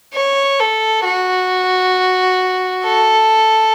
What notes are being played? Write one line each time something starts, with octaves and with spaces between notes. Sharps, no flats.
C#5
A4
F#4
A4